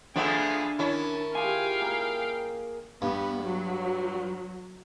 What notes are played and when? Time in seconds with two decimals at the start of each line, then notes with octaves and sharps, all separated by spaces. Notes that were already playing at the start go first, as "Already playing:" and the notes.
0.16 F3 A3 B3 D4 G#4 E5 F5
0.79 D#3 C#4 E4 A5
1.35 F4 G4 G#4 F5 G5 G#5
1.81 A#3 F#5
3.02 G2 B3
3.43 F#3